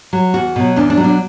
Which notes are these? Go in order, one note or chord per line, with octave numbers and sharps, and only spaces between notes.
F#3
E2 F#4
B2 F#3
E2 D4
D4
B2 F#3
D4